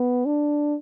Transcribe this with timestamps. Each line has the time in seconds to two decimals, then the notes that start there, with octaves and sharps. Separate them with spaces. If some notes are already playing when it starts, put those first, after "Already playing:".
Already playing: B3
0.25 D4